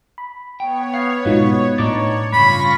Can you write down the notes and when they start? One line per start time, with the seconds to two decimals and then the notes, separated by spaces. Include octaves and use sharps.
0.18 B5
0.60 B3 C#5 G5
0.94 F5
1.26 G#2 B2 F#3 D#4 F4
1.78 A2 D4 D#4 C#5 D6 A6
2.32 G2 C#3 F4 B5 C#6 A#6